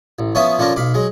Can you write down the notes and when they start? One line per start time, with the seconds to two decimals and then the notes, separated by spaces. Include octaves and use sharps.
0.19 A1
0.35 F3 B3 C#4 C#5 E5 D#6
0.58 D3 F3 C#4 D4 A#4
0.76 B1 F5 B5 D6
0.94 F#3 G#3